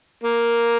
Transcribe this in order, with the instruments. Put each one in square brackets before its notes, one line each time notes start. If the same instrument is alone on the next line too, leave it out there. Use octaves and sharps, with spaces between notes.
[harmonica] A#3